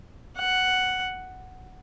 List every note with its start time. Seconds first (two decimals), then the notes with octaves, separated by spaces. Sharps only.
0.37 F#5